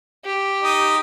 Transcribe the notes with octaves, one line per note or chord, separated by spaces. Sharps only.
G4
D#4 D#5